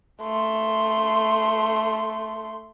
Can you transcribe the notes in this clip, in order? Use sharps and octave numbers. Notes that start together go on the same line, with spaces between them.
A3 C6